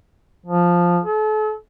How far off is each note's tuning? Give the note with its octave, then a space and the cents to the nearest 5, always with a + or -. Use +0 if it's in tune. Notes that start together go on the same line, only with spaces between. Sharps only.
F3 +5
A4 -40